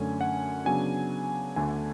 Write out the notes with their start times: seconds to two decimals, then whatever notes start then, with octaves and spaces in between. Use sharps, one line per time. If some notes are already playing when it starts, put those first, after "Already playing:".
Already playing: F#2 D3 A3 C#4 G#5
0.21 F#5
0.65 C#3 F#3 B3 D4 G#5
1.56 D2 D3 A3 D4 G#5